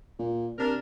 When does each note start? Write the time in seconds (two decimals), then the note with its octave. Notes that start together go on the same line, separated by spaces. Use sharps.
0.19 A#2
0.58 C3 D4 A#4